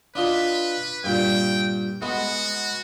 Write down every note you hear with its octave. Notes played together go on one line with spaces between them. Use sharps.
D4 F4 B4 D#5
G2 A#2 G5
G#3 B3 F#4